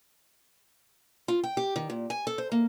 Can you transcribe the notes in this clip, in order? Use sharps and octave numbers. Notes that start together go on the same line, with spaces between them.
F4
G5
G4
D#3
A#2
G#5
A4
C5
A#3